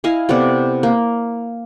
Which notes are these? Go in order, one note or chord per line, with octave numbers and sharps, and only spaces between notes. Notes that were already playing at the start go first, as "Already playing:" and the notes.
E4 D#5 F5 G#5
C3 B3 A4 D5
A#3